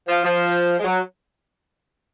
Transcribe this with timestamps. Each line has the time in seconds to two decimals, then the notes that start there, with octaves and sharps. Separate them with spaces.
0.08 F3
0.23 F3
0.79 G#3
0.84 F#3